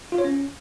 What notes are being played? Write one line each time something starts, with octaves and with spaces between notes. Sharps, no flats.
F4
C#5
C#4